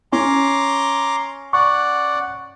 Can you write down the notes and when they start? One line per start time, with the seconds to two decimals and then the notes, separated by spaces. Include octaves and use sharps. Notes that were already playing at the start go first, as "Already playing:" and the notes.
0.12 C#4 A#5 C6 D6
1.53 D5 F#5 C#6